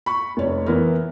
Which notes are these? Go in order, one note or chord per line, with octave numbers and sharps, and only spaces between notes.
B5 C#6
F1 C#5
E3 B3 E4 A#4